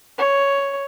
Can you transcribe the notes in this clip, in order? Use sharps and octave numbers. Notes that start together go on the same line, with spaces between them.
C#5